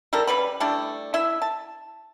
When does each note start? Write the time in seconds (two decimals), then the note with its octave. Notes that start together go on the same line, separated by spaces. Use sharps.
0.13 G3 E4 A4 A#4
0.27 C#3 G3 B4 B5
0.60 G3 A3 D4 E4
1.14 E4 E5
1.42 A5